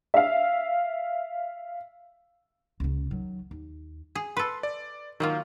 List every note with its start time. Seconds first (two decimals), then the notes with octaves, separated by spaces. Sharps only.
0.14 E5 F5
2.80 C#2 C#3
3.11 D#3 F#3
3.51 D#2
4.15 G#4
4.37 A4 B4 C6
4.63 D5
5.20 D#3 F#3 A#3 F4